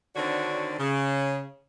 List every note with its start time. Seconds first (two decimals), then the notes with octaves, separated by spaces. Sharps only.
0.16 D3 D#3 C4 D4 F#4 C#5
0.79 C#3